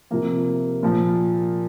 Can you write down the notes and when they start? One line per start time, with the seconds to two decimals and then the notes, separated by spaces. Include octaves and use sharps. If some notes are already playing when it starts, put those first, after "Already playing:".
0.10 C3 F3 A#3
0.83 A#2 F3